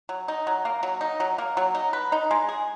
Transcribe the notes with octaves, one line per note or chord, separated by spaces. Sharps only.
F#3
D#4
F#3
A#3
F#3
D#4
F#3
A#3
F#3
D#4
B4
D#4
G#3
G#4